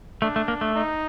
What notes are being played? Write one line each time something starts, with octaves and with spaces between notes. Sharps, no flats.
A3 D4
A3
A#3
A3
D#4